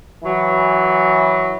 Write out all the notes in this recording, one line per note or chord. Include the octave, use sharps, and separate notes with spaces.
E3 F#3